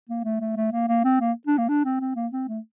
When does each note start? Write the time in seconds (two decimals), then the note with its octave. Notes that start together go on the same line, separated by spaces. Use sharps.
0.09 A#3
0.24 A3
0.40 A3
0.57 A3
0.72 A#3
0.88 A#3
1.04 C4
1.21 A#3
1.47 D4
1.58 A#3
1.69 D4
1.85 C4
2.00 C4
2.16 A#3
2.32 C4
2.48 A3